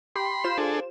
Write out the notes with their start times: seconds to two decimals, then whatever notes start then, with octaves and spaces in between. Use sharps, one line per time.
0.16 G4 B5 C6
0.44 F4 C5 E7
0.58 D4 G#4 A4